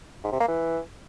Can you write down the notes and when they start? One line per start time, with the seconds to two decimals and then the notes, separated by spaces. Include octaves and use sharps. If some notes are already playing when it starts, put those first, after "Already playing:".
0.24 G#2
0.32 C3
0.40 A#3
0.48 E3